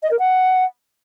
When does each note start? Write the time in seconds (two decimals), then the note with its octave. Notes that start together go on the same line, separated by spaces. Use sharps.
0.03 D#5
0.11 A#4
0.19 F#5